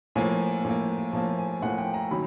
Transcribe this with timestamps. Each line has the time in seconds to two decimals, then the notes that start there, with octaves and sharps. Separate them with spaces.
0.16 A2 F3 A#3 G#5
0.64 A2 F3 A#3
1.13 A2 F3 A#3 A5
1.38 G#5
1.62 A2 F3 A#3 F#5
1.78 G5
1.94 A#5
2.11 D#3 F#3 A#3 B5